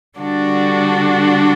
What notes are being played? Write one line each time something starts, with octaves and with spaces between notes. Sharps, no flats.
D3 G3 D4 F#4 A4